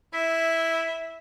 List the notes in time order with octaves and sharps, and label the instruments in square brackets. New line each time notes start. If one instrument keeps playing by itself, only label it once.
[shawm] E4 [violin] E5